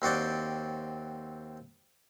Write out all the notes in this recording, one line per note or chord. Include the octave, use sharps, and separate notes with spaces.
D#2 C4 F#4 D5 G5